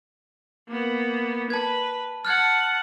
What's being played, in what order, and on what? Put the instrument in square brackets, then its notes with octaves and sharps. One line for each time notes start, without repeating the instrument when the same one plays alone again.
[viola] A#3 B3
[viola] B4 [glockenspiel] A5 G#6
[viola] F#5 A5 [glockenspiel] F6 F#6 G#6